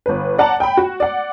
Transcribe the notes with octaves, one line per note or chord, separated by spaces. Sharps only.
G1 B4
D5 F#5 A5 A#5
G5 B5
F#4
D5 F#5